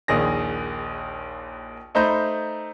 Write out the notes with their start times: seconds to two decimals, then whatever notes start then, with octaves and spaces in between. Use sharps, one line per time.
0.08 A#1 D#2 D#3 G#4 A#6
1.95 A3 D#4 C5 A#5 B5 G6